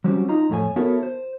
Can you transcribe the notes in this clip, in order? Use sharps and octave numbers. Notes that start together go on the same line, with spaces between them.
F#3 G3 C4 C#4 F#4
D#4 F4 D#5 A#5
F2 A2 A3 F#4 C#5 G#5
B3 E4 F#4 A4 A#4 C#5
C5